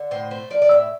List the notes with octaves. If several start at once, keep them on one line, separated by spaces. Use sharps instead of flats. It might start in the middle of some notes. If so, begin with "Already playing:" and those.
Already playing: D3
A2 C5
A3 C5
F3 D5
D5
A2 E5